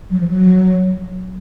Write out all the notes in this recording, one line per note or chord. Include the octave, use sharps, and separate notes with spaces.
F#3
F3
F#3